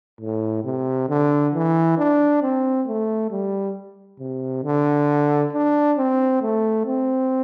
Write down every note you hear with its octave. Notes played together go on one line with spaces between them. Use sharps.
A2
C3
D3
E3
D4
C4
A3
G3
C3
D3
D4
C4
A3
C4